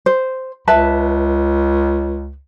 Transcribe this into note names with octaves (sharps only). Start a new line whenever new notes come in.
C5
C#2 B4 E5 A5